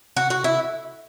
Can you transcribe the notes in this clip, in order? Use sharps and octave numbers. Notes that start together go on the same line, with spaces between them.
F#4
F#4
E4